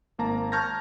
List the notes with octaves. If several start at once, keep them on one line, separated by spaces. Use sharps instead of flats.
G#1 A#3 A5 A#5
A5 C#6 F6 G6 G#6 A#6